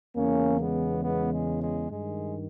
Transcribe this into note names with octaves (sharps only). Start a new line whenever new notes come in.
E2 C#3 E3 A#3 C#4
G#3 B3
G#3 B3
G#3
G#3
G2 D#3 G#3